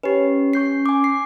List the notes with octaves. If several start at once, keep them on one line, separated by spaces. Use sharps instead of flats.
C#4 G4 B4
C#6 G6 C7
G#5 D6
C7